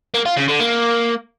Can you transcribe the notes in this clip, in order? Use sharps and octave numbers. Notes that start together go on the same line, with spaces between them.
A#3
F4
C#3
D3
A#3